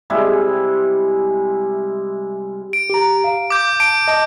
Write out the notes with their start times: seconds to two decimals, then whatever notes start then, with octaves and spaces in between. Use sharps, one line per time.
0.10 C3 G3 G#3 E4
2.73 D7
2.90 G4 A#5
3.24 F5
3.50 D6 G6
3.80 A5 D7
4.08 D#5 A5 D#6